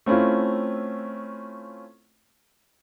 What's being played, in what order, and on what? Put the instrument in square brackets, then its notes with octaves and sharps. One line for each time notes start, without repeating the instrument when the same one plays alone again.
[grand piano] A3 C4 C#4 E4 F4